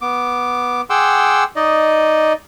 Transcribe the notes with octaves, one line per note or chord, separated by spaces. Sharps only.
B3 D6
G#4 F#5 G5 C6 D6 E6
D#4 D5 D#5